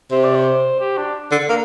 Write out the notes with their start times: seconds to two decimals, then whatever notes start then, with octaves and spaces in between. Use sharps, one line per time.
0.11 C3 C5
0.24 D5
0.35 C5
0.80 G4
0.97 D4
1.32 D3
1.49 A#3